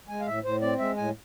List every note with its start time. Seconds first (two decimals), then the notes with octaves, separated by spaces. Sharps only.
0.08 G#3 G#5
0.21 F5
0.26 A2 E5
0.44 A2 C5
0.61 C4 D5
0.79 G#3 E5
0.97 A2 G#5